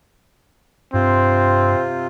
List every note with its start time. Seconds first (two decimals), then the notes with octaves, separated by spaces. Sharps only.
0.94 G2 C3 C4 F4